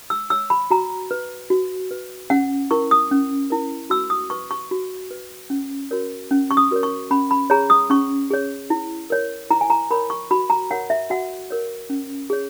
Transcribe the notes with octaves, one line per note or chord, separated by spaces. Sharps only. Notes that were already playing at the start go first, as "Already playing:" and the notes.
E6
C#5 E6
B5
F#4 A#5
B4
F#4
B4
C#4 F#5
E4 A#4 C#6
D#6
C#4
E4 A#4
F#4 E6
D#6
B4 C#6
C#6
F#4
B4
C#4
F#4 A#4 C#5
C#4
C#6
D#6
F#4 A#4 C#5
C#6
C#4 B5
B5
G#4 C#5 A#5
D#6
C#4 C#6
G#4 C#5
E4
A#4 C#5
E4 A#5
G#5
A#5
A#4 C#5 B5
C#6
F#4 B5
A#5
A#4 C#5 F#5
E5
F#4 F#5
A#4 C#5
C#4
G#4 C#5